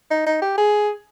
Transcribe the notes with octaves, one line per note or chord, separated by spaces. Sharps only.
D#4
D#4
G4
G#4